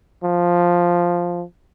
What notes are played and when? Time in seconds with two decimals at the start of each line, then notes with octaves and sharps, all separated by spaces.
0.24 F3